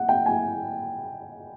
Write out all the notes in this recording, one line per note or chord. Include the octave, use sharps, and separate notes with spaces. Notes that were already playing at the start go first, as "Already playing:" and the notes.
Already playing: F#5
G5
G#5